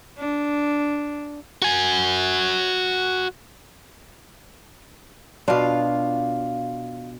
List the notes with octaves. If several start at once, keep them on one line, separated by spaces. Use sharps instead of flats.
D4
F#4 G#5
B2 D4 F4 F5